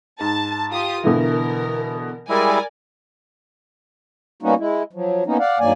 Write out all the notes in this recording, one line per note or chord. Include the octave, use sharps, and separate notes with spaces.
G#2 A5
F4 G4 D#6
B2 D3 E3 A#4
G3 G#3 E4 A#4 D5 G#5
G3 A#3 B3 C#4 D#4 F#4
G#3 E4
F3 F#3
A#3 B3 C#4 D#4
D5 F5 F#5
G2 D#3 F#3 A#3 D5 G#5